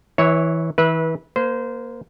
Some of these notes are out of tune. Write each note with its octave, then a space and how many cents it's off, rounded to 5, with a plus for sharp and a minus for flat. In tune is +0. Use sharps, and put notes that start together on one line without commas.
E3 -15 C#5 +0 E5 -40
E3 -35 B4 -20 E5 -15
A#3 +10 C5 -20